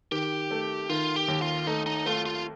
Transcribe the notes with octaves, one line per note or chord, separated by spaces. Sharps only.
D#3 G4
A3
D#3 F4
G4
D#2
F4
A3 D#4
D#4
A3 F4
F4